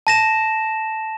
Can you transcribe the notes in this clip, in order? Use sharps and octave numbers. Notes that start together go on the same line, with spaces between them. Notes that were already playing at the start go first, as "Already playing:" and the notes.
A5 A#6 E7